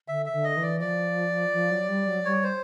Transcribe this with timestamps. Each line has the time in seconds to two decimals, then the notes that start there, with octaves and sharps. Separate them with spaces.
0.08 D3 E5
0.26 E5
0.32 D3
0.44 D#5
0.57 E3
0.62 D5
0.81 F3 D5
1.53 F3
1.71 F#3
1.89 G3
2.07 F#3
2.25 G3 C#5
2.44 C5